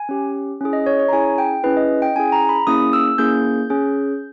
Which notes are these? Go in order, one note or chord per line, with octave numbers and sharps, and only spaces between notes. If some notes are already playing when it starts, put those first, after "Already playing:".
Already playing: G#5
C#4 G4
C#4 E4 G#4
D#5
C#5
C#5
A#5
C#4 E4 G#4 G#5
G5
C#4 E4 G#4 B4
D#5
G5
C#4 E4 G#4 G#5
A#5
B5
A#3 C#4 E4 G#4 D#6
E6
A#3 C#4 E4 G#4 G6
C#4 G#4